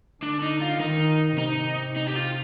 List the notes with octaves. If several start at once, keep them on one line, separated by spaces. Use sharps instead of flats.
D3 D4
D#4
F4
D#3 D#4
C3 D#4
D#4
G4
F4